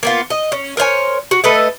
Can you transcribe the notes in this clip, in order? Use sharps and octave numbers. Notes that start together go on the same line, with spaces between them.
A#3 B3 F4
D#5
C#4
A#4 C5 C#5 G#5
F#4
A3 A4 B4 D#5